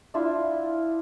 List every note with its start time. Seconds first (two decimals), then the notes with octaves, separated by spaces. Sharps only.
0.14 D4 E4 F4 E5